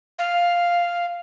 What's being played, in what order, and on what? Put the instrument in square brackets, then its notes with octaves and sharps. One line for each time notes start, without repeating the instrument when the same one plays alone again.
[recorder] F5